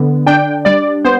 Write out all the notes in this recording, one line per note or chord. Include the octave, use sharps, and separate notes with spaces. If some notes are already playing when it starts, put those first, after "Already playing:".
Already playing: D3 B3
D4 G5
G3 D5
B3 C5